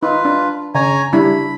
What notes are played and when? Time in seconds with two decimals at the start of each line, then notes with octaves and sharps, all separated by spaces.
0.03 D#4 F4 B4
0.25 D4
0.75 C#3 C#5 G#5 A#5
1.13 G3 D4 E4 B5